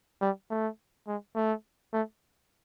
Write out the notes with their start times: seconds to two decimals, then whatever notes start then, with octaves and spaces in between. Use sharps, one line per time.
0.22 G3
0.50 A3
1.07 G#3
1.35 A3
1.93 A3